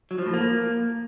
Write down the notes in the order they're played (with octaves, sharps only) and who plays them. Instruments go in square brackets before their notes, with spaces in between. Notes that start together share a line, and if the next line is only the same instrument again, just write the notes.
[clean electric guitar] F#3
F3
A2
A#3